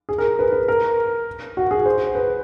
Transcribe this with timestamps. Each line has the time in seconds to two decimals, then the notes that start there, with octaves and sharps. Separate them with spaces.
0.09 G#4
0.18 A#4
0.39 B4
0.53 B4
0.68 A#4
1.57 F#4
1.71 G#4
1.85 C5
2.15 B4